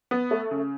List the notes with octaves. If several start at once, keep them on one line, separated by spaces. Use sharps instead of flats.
B3
A3
C#3